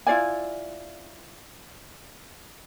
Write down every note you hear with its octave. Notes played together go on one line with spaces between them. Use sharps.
E4 F4 D5 G#5